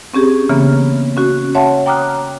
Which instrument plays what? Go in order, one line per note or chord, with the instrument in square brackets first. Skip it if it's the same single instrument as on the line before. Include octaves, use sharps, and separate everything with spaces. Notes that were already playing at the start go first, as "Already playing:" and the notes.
[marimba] C4 C#4 G4 G#4
C#3 E3 A#3 B3
C#4 F#4
C#5 E5 F#5 A5 C6
G5 A#5 D6 D#6 F6 F#6